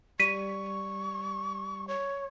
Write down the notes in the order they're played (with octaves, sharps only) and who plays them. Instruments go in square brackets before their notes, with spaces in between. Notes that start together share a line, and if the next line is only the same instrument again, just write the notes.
[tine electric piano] G3 [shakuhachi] C#6 [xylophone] B6 D#7
[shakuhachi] C#5